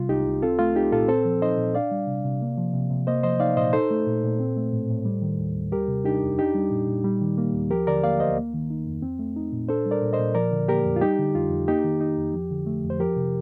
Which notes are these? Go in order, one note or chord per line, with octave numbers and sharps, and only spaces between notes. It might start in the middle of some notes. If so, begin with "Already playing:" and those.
Already playing: C3 G3 F4
C2 D#4 G4
C2
C4 F4 A4
A3 F4
D#4 G4
A#2 F4 A4
C4 A4 C5
F3
D#4 C5 D#5
A#2
D4 D5 F5
G3
C3
C3
A#3
F3
C3
C3
A#3 C5 D#5
F3 C5 D#5
D#4 D5 F5
A#2 C5 D#5
D#4 A4 C5
A3
A#2
A#2
C4
A3
A2
A2
G3
D#3
D#2
D#2
G3 G4 A#4
C3
D4 D#4 G4
F2
D4 D#4 G4
G3
A#2
A#2
G3
D#3
A#3
D#2
F3 G4 A#4
D3 A#4 D5
A#3 D5 F5
D2 C5 D#5
A#3
D#3
D#4
F2
C4
A3
D#4
A#2
D4 A4 C5
G3
A#4 D5
A#2
C5 D#5
A#2
F3 A#4 D5
D3
A#3 G4 A#4
F2
F4
G3 D#4 G4
D3
F2 F4
F2
A#3 D#4 G4
D#3
D#4
F2
F3
D3
A3
F2
C5
F3 G4 A#4
C3